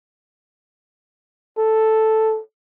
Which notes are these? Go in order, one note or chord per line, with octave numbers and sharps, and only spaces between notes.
A4